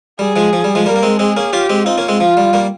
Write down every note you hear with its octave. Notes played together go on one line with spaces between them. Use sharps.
G3 G#4
F3 G#3
F3
G3
F3 G#3
G3 A#3 A#4
A#3
G#3 C4
G#3 C4 G#4
A#3 C#4
C#4 F4 G4
G#3 C4
C4 D#4 F4
A#3 C#4
G#3 C4
F3 F4
G3
G3 A#3